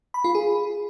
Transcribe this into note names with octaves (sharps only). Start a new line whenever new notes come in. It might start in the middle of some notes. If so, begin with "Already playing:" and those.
B5
F4
G#4